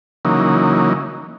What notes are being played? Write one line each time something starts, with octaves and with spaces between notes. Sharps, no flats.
C#3 E3 F#3 A#3 D#4